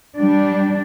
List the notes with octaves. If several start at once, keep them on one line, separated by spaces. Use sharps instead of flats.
G3 D4